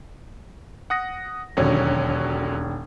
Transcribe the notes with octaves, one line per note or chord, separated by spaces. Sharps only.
F#5 D#6 A#6
E1 D#2 D3 F#3 C#4 C#5